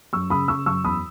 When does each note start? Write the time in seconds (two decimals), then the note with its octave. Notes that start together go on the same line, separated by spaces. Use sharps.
0.13 F#2 C#6 E6
0.30 C#3 B5 D#6
0.48 C#3 C#6 E6
0.66 F#2 C#6 E6
0.84 E2 B5 D#6